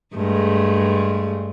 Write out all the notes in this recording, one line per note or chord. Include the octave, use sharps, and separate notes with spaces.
G2 G#3 A3